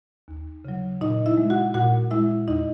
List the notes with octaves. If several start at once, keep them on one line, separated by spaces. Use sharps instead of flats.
D#2
C#3 F#3
A#2 D#4 D#5
E4 E5
G#3
F#4 F#5
A#2 F#4 F#5
G#3 E4 E5
E2 D#4 D#5